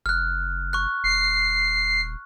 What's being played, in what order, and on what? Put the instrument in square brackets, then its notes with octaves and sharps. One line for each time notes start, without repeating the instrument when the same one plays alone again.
[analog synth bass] F#1 [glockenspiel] F6 F#6
[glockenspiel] C#6 F#6
[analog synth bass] D#1 [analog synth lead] C7